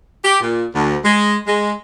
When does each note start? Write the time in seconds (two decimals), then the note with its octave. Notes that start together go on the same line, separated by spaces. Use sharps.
0.25 G4
0.41 A#2
0.75 D2
1.04 G#3
1.47 G#3